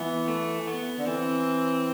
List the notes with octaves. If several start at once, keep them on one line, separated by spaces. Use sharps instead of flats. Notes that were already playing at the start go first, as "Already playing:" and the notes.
Already playing: E3 B3
A3
B3
D3
E3 C4